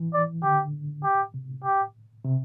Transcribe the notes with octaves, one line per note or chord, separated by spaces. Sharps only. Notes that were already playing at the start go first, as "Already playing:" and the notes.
Already playing: E3
D5
D3 G4
G4
C3
G4
C3